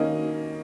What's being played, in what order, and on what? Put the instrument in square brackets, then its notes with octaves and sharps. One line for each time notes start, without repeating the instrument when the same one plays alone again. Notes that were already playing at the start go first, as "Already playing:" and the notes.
Already playing: [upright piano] D#3 A#3 C#4 D#5